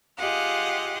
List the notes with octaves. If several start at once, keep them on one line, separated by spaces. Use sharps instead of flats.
F4 G4 G#4 D#5 F5 F#5